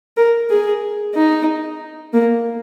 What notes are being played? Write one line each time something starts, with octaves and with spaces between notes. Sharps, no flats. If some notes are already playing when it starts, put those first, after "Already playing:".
A#4
G#4
D#4
A#3